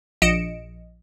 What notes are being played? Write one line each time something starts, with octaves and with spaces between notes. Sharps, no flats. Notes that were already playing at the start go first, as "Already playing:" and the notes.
A#1 D#5 C#7 D7 E7